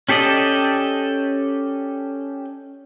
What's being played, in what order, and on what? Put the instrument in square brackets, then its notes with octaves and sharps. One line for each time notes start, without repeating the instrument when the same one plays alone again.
[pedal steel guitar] C#4 G4 A4 D5 D#5